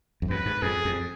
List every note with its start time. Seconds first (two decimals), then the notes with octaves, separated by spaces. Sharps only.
0.22 F2
0.30 F#2 B4
0.46 G#2
0.62 F2 G#4
0.85 F2